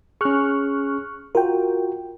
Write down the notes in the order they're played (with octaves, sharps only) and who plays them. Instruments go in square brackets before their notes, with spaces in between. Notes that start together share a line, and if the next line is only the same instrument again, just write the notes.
[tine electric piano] C#4 G#4 [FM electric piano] C#6 F6 F#6
[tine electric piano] F4 F#4 [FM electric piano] A#4 G5